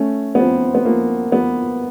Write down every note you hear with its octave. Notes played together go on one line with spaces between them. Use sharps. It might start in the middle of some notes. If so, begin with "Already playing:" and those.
Already playing: A3 C#4
B3
F3 C4
B3
F3 A#3
F3 B3